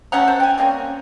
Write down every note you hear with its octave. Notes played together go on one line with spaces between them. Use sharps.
A3 C#4 F#5 A#5
C5
G5 G#5
G3 A#3 C4 C#4